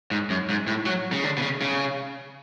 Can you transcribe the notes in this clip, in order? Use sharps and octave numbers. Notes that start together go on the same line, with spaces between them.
G#2
F#2
G#2
A2
F#3
C#3
D3
B2
C#3
C#3